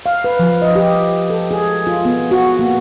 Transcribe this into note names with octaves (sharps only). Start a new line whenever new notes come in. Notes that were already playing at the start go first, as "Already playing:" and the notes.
F5
B4
F3
D#5
G4
A4
G#4
F4
B3
F#4
A#3